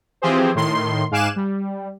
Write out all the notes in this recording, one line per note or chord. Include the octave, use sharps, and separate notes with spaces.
E3 F3 C4 G4 G#4 C5
A2 D#3 C6
G#2 F5 G#5 D6 F#6 E7
G3